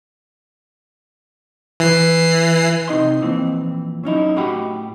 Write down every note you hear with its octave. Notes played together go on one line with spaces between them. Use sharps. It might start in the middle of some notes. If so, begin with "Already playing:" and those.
E3 C7
C3 D#4 D#5 C6
F2 A#2 E3 C4
F#3 C#4 D#4 E4
A2 F#4 G4 F#5 B5